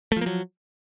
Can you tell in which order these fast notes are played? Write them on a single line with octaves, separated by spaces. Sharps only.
A3 F3 A#3 F#3